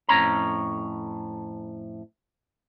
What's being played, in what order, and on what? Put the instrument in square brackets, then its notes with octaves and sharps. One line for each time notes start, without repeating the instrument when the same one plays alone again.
[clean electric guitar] F2 A2 C#4 A#5